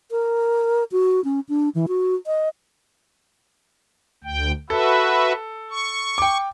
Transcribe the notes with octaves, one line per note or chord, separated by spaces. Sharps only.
A#4
F#4
C#4
D4
E3
F#4
D#5
D2 G5
F#4 A4 B4 E5
C#6
G5 D6